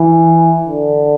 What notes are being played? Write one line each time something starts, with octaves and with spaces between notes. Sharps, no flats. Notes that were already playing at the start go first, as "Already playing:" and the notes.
Already playing: E3
D3